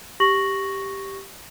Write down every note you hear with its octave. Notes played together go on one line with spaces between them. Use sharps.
G4 C#6 A#6 F#7